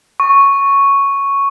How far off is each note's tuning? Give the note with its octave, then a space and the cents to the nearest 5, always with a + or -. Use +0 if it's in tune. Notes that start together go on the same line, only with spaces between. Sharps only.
C#6 +0